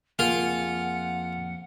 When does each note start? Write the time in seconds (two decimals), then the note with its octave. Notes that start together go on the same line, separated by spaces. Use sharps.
0.19 F2 A#3 F4 G#4 F#5